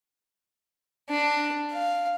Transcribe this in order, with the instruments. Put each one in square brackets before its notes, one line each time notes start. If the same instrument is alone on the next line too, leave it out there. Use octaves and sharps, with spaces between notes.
[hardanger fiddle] D4
F5